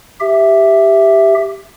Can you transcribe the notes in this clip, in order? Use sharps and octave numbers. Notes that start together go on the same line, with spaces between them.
G4 E5